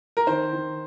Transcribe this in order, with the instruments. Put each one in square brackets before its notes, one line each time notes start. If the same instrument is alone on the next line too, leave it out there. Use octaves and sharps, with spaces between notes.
[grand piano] A#4
D#3 C5
D#3